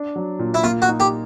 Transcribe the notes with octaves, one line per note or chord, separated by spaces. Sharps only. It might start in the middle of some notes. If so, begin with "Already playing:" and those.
Already playing: D4
F#3
A#2
E4
A#3 F4
F#4
D#4
G4